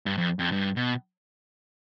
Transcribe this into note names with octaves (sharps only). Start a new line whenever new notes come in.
G2
F2
F2
G2
B2